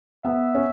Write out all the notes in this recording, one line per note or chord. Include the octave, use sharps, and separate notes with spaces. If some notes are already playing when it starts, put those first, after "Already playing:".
B3 E5
C#4